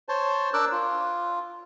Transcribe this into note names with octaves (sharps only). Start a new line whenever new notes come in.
C5 C#5 A5
D4 A#4 D6 E6 F#6
F4